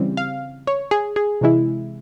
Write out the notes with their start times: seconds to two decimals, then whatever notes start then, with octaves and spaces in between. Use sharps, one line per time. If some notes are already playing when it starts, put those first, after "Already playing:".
Already playing: C#3 E3 G3 C4
0.17 F5
0.67 C#5
0.91 G#4
1.16 G#4
1.41 C3 E3 G#3 E4